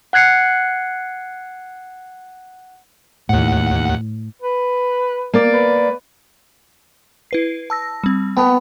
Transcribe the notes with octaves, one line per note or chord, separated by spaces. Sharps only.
F#5 F#6 G#6 C7 C#7
D#2 A2 F#5
B4
A#3 D5
B4
E4 B4 C7
A5 E6 A#6
G3 C4
B3 G5 A5 D#6